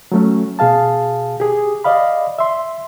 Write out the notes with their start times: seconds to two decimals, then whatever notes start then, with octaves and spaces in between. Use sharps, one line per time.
0.12 F#3 A3 C#4
0.59 B2 G#4 F5 A5
1.40 G4 G#4
1.84 D5 D#5 F5 B5
2.39 E5 C6